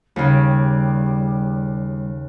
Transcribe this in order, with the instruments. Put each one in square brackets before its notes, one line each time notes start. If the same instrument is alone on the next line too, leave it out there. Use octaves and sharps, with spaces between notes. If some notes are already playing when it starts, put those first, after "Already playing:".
[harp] D#2 C#3 [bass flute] G3